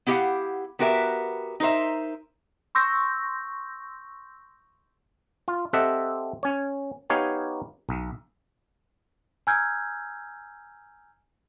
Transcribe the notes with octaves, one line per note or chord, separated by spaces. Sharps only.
B3 E4 G4 D#5 F5 F#5
B3 F#4 G4 A#4 B4 E5
D#4 A#4 C5 E5
C6 C#6 E6 G6 A#6
F4
C4 G4 A4 D#5 E5 F#5
C#4 C#5
B3 D#4 G4 C#5 F5 G#5
B1
G#5 A#5 E6 F6 G6 G#6